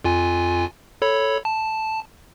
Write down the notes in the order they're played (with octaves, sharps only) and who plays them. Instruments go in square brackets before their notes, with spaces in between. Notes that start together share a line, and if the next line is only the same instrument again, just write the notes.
[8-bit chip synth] F2 F4 G#5
A4 C#5 B5
A5